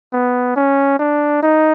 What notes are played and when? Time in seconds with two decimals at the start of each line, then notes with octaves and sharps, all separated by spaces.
0.13 B3
0.56 C#4
0.99 D4
1.42 D#4